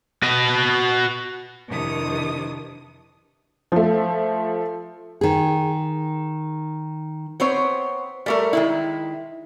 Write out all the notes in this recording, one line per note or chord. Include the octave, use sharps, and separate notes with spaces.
F#4 D#5
F2 C3 D#3 E3 D4 D#6
F3 A3
D#3 G#4
B3 C4 C5 C#5
G3 A3 A#4
D#3 G#3 E4